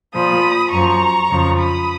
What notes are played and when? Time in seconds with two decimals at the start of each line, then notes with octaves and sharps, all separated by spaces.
0.14 A#2 F3 B5 D#6
0.72 F#2 F3 A#5 C#6
1.30 F2 C#3 F3
1.58 B5 D#6